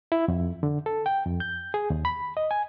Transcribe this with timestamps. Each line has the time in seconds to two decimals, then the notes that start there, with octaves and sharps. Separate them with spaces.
0.12 E4
0.28 F2
0.63 D3
0.86 A4
1.06 G5
1.26 F2
1.40 G6
1.74 G#4
1.90 D#2
2.05 B5
2.37 D#5
2.51 G#5